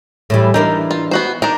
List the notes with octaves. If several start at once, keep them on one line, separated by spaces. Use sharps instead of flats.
A2 E3 G3
E3 D4 D#4 A#4
F4
B3 F#4 C5
D4 D#4 A#4